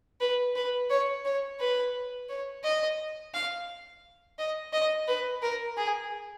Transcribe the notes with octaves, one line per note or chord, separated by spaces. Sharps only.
B4
B4
C#5
C#5
B4
C#5
D#5
F5
D#5
D#5
B4
A#4
G#4